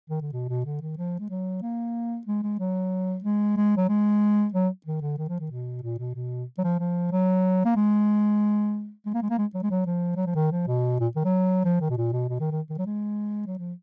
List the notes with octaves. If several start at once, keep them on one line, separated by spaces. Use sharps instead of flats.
D#3
D3
B2
B2
D3
D#3
F3
G#3
F#3
A#3
G#3
G#3
F#3
G#3
G#3
F#3
G#3
F#3
D#3
D3
D#3
F3
D#3
B2
A#2
B2
B2
F#3
F3
F3
F#3
A#3
G#3
G#3
A#3
G#3
A#3
G#3
F#3
G#3
F#3
F3
F#3
F3
D#3
F3
B2
A#2
D#3
F#3
F3
D#3
B2
A#2
B2
B2
D#3
D#3
D#3
F#3
G#3
F#3
F3